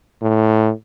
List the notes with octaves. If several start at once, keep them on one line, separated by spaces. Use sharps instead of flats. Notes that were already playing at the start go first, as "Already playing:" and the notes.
A2